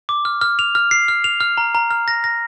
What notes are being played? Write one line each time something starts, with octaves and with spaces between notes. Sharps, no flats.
D6
F6
F6
F7
F6
C7
F6
F7
F6
A#5
A#5
F6
A#6
A#6